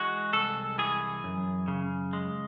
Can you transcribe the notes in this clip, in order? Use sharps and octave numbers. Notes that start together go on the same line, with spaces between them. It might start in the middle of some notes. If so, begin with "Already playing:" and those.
Already playing: E3 G#3 F#4
C2 A4
E3 G#4
F#2
C#3
G#3